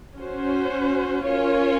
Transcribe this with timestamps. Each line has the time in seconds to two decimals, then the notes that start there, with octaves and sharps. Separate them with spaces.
0.17 C#4 F#4 C5
1.24 C#4 F4 A#4 C#5